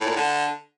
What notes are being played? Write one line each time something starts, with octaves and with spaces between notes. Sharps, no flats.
A2
A#2
A2
D3